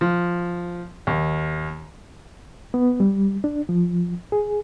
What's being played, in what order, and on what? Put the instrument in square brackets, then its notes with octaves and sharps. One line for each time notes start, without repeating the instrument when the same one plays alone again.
[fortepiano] F3
D#2
[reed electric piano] B3
G3
D4
F3
G#4